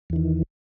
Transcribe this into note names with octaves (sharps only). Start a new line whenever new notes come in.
E2 D#3 E3